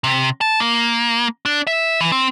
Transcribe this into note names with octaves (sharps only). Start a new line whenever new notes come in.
C3
A5
A#3
D4
E5
E3
C4